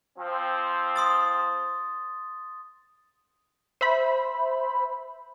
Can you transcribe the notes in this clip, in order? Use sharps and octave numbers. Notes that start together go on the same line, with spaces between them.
F3 C4
C6 D#6 A6
C5 E5 B5